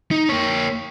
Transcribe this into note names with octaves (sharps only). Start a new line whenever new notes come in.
D#4
A#3 C#5